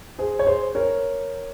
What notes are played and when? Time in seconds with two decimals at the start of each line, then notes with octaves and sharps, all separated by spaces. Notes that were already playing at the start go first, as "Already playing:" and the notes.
0.19 G#4 C5
0.39 C#5
0.46 G#4 C5
0.75 A#4 C#5